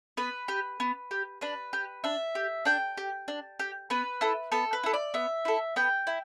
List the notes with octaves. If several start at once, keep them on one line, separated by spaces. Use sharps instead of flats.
B3 B4
G4
B3
G4
D4 B4
G4
D4 E5
G4
D4 G5
G4
D4
G4
B3 B4
E4 A4
B3 A4
B4
E4 A4
D5
B3 E5
E4 A4
B3 G5
E4